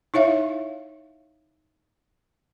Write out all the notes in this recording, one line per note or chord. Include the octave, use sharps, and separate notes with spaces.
D#4 E4 C#5 E5 F5